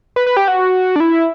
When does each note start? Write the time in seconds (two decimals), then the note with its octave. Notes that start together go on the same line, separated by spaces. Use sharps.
0.16 B4
0.27 B4
0.37 G4
0.48 F#4
0.96 D4
1.00 E4